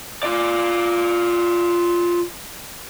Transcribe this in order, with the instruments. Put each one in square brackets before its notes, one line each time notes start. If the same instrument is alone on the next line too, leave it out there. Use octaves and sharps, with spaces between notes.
[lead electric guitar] F4 D5